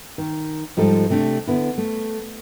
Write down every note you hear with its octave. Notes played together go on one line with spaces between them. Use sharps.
D#3
G#2 F3 G3 A4
C3 A3 C4 D4
D3 B3 E4
A3